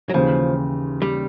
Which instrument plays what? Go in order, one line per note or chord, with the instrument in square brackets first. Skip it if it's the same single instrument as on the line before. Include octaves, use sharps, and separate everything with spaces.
[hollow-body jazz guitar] F#3
[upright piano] D#2 C#3 E3 [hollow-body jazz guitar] F3
[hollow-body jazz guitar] G3